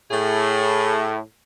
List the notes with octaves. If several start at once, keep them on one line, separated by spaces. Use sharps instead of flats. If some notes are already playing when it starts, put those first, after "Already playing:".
A2 A3 G#4